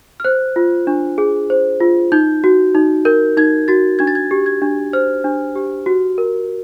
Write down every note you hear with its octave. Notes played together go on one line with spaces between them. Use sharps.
F6
C5 F#6
F4
D4
G#4
C5
F4
D#4 G6
F#4
D#4
A#4 G6
D#4 G#6
F#4 A6
D4 G#6
A6
G#6
G4
G#6
D4
C5 F6
D4
G4
F#4
A#4